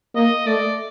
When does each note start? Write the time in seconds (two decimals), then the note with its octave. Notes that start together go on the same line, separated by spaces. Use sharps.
0.15 A#3 D#5
0.47 A3 D5